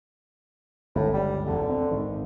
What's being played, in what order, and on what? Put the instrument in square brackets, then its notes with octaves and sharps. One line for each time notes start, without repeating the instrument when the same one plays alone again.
[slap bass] G1 C#2 [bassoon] A2
[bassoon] G3
[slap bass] E1 E2 B2 [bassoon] D3
[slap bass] C4
G#1 D#3